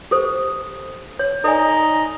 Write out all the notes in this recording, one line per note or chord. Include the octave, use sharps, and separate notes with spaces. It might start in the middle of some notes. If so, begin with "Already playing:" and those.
G4 A4 C5
C#5
D#4 A4 D5 G#5